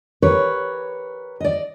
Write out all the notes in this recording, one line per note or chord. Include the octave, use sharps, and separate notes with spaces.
G4 A#4 B4 C#5
D5 D#5